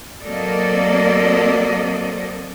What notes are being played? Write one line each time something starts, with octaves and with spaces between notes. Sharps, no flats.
F#3 A#3 C4 A4 D5 D#5